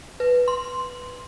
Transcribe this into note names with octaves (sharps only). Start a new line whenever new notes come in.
B4
C6